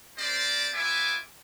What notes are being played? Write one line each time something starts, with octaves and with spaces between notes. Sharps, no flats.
C4 G4 A#4 C5 D5
B3 F4 E5 G#5 D6